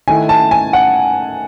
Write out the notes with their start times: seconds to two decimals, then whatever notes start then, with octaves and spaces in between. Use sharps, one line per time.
0.08 D#3 A3 E4 G#5
0.29 A5
0.51 G#5
0.73 F#5